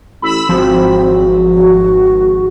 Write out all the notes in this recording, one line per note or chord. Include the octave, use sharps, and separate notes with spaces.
A1 B5 E6
G#1 F3 F#3 C4
F#4